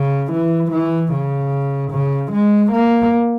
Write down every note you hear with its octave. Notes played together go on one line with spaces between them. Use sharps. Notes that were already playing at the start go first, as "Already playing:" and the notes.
Already playing: C#3
E3
E3
C#3
C#3
G#3
A#3